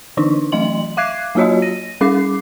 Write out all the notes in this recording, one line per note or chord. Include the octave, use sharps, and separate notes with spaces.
D3 E3 D4 D#4
E3 F#3 A3 D#5 C6 F#7
E5 F5 D6 F#6 G#6 C7
F#3 A#3 F4 F#4 C#5 D#5
A#6 D#7
G3 C#4 G#4 D6 C7